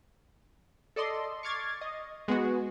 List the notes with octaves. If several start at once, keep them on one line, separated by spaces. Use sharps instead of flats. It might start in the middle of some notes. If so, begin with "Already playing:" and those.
A4 D5 D#5 C6
C#6 D6 F6 G#6 A6 C7
D#5
G#3 B3 F#4